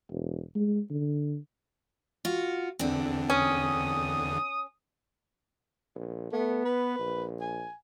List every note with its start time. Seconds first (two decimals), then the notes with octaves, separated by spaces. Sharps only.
0.11 E1
0.55 G#3
0.90 D3
2.25 F4 F#4
2.79 E2 D3 C4 D4
3.30 C#4 D#6
5.95 A#1
6.32 A3 B3
6.65 B4
6.99 A#1
7.41 G#5